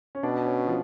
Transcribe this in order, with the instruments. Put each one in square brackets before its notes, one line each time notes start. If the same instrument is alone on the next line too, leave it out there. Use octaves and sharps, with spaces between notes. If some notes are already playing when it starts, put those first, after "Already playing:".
[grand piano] C#4
[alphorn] B2 [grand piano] D4
[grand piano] C#4
F3